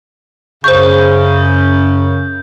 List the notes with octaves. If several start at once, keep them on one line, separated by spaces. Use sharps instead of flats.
F#2 C#3 C5 C#6 G6